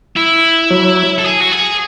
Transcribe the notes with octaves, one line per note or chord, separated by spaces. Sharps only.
E4
F#3
A4
G#4
F#4
G#4